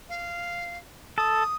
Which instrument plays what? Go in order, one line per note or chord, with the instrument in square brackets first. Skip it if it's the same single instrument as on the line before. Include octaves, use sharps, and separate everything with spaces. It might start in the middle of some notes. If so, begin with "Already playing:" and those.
[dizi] F5
[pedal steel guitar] A4 [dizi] D#6